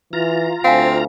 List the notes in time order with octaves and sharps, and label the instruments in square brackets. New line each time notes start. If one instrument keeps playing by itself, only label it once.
[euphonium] E3 [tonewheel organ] F4 A#5
[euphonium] D2 [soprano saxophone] C4 [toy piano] F5 G#5